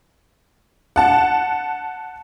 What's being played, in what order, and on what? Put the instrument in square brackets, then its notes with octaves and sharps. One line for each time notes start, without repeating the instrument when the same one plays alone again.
[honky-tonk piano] F#5 A5